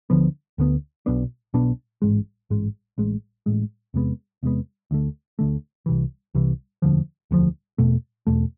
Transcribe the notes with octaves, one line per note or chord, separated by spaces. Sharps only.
D2 D3 F3 B3
D2 D3 F3 B3
B1 B2 B3 D4
B1 B2 B3 D4
A1 G#2 G#3
A1 G#2 G#3
A1 A2 G#3
A1 A2 G#3
E2 C3 G#3 B3
E2 C3 G#3 B3
D2 D3 A3
D2 D3 A3
C2 C3 E3
C2 C3 E3
E1 D2 D3 F3
E1 D2 D3 F3
E2 B2 A3
E2 B2 A3